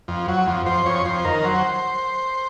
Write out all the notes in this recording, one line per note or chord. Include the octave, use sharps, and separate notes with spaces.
F2
F#3
F2
F2 C5
F2 C#5
F2 C5
D#3 A#4
F#3 C5